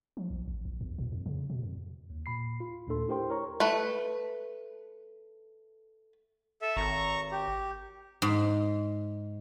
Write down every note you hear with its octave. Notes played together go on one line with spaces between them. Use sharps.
F3
A#1
A1
A#1
E2
A#2
F2
C#3
B2
F2
D#2
A#2 B5 C7
F4
D#2 A#2 A3 D4 A4 C6
E4 G4 A#4 C5 G5 C6
A#4 C#5 A#5 C#6
A3 B4
A4 E5
G#1 A#5 C#6
G4
G#2